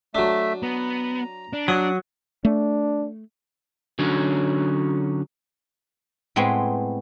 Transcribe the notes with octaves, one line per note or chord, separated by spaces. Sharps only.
F#3 A3 D4 E5
B3 A#5
D4
F#3 F#5 D#6
A3 D4
D3 F#3 C#4 D#4 F#4
A2 G#3 B3 C4